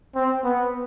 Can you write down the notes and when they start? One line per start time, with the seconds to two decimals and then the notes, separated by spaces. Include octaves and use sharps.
0.16 C4
0.45 B3